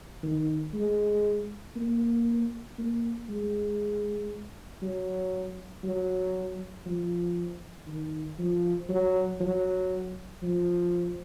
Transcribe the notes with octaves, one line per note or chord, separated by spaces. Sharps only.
D#3
G#3
A#3
A#3
G#3
F#3
F#3
F3
D#3
F3
F#3
F#3
F3